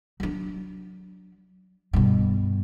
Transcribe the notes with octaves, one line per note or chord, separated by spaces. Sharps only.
F#3 D4
G2 B2